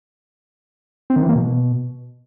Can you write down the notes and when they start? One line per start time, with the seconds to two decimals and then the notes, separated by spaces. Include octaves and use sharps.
1.10 C4
1.16 D#3
1.23 E3
1.29 A#3
1.35 B2